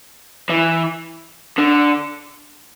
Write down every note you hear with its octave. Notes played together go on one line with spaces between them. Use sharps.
E3
D3